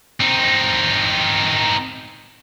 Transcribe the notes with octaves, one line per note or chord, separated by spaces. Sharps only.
C4 D#4